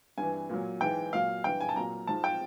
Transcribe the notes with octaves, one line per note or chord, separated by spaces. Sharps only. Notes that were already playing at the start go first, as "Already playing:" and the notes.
G2 E3 G#5
A#2 F#3
G#2 E3 G5
A#2 F#3 F5
G2 E3 G5
G#5
A5
A#2 F#3 A#5
G#2 F3 A5
G5